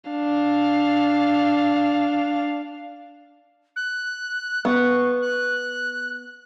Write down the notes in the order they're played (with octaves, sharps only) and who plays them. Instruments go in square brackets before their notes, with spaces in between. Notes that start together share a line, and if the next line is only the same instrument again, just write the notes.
[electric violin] D4 F5
[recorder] F#6
[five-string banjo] B3 [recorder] C#6
[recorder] F#6